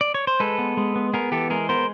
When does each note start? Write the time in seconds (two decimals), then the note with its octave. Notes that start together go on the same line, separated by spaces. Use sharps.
0.01 D5
0.14 C#5
0.27 C5
0.40 G#3 A4 B4
0.59 B3
0.77 G#3
0.96 B3
1.14 B3 G#4 A#4
1.32 E3 G4 A4
1.50 G#3 G#4 A#4
1.69 B3 A#4 C5